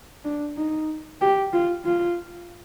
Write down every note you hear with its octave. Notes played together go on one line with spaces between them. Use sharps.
D4
D#4
G4
F4
F4